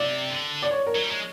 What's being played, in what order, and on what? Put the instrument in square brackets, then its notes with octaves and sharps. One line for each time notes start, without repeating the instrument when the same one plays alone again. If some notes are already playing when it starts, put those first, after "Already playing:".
Already playing: [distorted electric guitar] C3 [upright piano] D5
[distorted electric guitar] D3
[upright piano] D5
C#5
A#4
[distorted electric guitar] F#3
G3
G#3